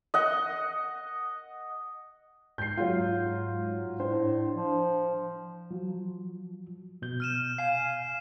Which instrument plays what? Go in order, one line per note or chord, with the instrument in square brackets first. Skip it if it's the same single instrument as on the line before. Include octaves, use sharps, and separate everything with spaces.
[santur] D#5 F#5
[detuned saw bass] G#2 [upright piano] G6 C7
[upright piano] F#3 F4
[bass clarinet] A2 [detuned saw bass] D4 [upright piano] C5
[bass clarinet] F3
[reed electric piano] F3 F#3
B2 G6
[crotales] F6 D#7 E7
[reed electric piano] F5 G#5 [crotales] C7